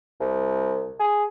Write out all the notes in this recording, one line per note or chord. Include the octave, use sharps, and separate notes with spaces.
C2
G#4